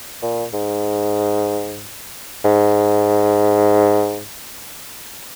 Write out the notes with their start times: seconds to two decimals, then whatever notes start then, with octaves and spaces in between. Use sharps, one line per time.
0.22 A#2
0.53 G#2
2.44 G#2